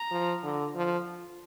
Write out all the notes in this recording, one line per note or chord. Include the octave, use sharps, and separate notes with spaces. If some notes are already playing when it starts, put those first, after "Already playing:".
Already playing: A#5
F3
D3
F3